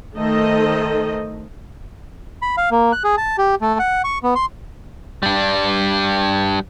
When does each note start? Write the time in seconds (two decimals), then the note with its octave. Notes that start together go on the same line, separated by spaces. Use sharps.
0.16 D#3 A3 A4 C5 D#5
2.42 B5
2.57 F5
2.71 A#3
2.92 F#6
3.04 G#4
3.18 A5
3.38 G4
3.61 A3
3.79 F#5
4.04 C#6
4.23 B3
4.35 C6
5.23 G3 D4